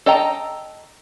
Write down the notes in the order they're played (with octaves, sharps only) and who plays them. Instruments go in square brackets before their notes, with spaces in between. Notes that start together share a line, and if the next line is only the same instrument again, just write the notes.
[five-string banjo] A4 D#5 G5 A#5